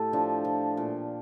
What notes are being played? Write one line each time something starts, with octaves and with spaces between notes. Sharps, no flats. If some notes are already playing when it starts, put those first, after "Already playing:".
Already playing: A2 A3 G4 A4
F3 D4
F3
A#2